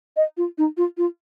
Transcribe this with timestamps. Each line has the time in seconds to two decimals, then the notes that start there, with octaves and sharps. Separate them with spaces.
0.17 D#5
0.37 F4
0.58 D#4
0.77 F4
0.98 F4